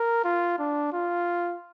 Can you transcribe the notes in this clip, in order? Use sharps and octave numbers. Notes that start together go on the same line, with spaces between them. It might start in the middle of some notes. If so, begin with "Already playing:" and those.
Already playing: A#4
F4
D4
F4